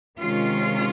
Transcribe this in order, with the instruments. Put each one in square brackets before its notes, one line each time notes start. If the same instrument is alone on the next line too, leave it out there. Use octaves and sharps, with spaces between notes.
[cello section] C3 D#3 G#3 C#4 F4